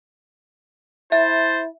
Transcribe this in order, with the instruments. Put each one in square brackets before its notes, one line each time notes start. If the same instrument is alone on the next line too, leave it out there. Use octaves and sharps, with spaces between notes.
[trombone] E4 [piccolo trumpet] C5 [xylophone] E5 [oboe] A5